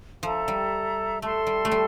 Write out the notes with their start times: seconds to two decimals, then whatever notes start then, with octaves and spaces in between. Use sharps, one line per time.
0.23 F3 A4 E5 A#5
0.48 G3
1.21 A3 A4 E5 A5 C6
1.47 G3
1.65 A3
1.72 G3